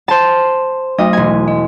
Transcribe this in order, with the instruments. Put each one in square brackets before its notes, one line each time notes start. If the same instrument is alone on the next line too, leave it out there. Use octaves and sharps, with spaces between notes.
[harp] C5 A5
[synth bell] F#3 A3 [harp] D#5
[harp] E1 G#5
[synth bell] D#5